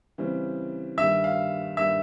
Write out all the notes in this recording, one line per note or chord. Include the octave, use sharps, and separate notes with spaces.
C#3 E3 G3 C4
G2 D#3 G3 E5
F5
G2 D#3 G3 E5